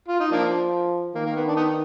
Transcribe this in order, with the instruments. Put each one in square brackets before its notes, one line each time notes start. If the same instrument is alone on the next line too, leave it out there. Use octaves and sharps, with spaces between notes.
[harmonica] F4
D#4
[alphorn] F3 [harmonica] A#3 D4
[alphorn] D#3 [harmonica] A#3
[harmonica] A#3
B3
D4
B3 D#4